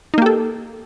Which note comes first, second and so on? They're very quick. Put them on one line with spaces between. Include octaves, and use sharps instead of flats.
D#4 A#3 G4 A4